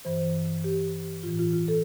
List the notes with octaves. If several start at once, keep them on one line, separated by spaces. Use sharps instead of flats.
G2 E3 C5
G4
A2 E3 F4
F4
F4
A4